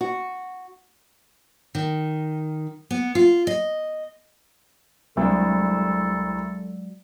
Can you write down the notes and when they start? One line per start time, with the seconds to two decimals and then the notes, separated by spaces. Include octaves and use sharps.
0.01 F#4
1.75 D#3
2.91 B3
3.15 F4
3.47 D#5
5.17 C2 F#3 G#3 D4 A4